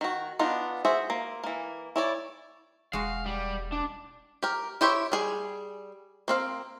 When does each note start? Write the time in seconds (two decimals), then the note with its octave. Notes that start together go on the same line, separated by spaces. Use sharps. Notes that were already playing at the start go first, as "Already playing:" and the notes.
0.01 D#3 F#4
0.39 B3 D4 D#4 F4
0.85 F#4 G#4 C5 E5
1.10 A#3
1.44 E3 A#3
1.96 E4 C#5 D5
2.93 E1 G#3 F#4 F5
3.26 G3
3.72 D4
4.43 G4 A#4
4.81 E4 G4 C5 C#5 E5
5.12 G3 G#4 G#5
6.28 A#3 C4 F5